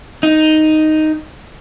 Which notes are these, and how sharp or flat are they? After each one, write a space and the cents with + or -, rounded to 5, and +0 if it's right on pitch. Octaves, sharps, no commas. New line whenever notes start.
D#4 +0